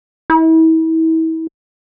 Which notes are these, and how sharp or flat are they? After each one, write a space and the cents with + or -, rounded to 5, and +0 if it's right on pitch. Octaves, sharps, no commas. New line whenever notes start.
E4 -35